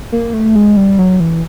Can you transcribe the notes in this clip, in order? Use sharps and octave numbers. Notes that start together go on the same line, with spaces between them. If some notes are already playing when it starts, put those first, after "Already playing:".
A#3
A3
G#3
G3
F#3
E3